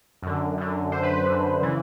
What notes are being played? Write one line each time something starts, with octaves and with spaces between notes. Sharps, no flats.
F#2 D3
F#2 D3
F#2 D3 C5
B4
B4
F#2 D3
C#3 E3